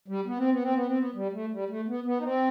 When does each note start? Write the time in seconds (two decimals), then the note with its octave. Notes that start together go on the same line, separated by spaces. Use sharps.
0.08 G3
0.26 B3
0.38 C4
0.51 B3
0.62 C4
0.75 B3
0.86 C4
0.99 B3
1.15 G3
1.33 A3
1.52 G3
1.69 A3
1.88 B3
2.06 B3
2.19 D#4
2.23 C4